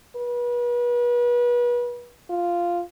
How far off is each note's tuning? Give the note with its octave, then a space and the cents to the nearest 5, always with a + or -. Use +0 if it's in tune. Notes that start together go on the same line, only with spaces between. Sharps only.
B4 -35
F4 -5